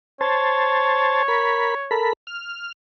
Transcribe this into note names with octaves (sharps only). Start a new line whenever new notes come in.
C5 C#5 A5
A#4 B5
A4 A#4 B5
F6